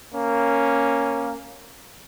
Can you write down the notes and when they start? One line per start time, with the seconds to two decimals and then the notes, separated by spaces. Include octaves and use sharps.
0.14 A#3 C#4